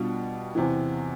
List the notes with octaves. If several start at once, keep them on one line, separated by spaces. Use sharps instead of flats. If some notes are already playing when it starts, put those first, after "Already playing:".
Already playing: B2 G3 D4 F4
E2 C3 E3